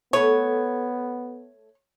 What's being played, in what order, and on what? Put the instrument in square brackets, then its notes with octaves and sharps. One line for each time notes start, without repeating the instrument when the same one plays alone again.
[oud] A3 A4 B4 [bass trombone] B3 [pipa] C#5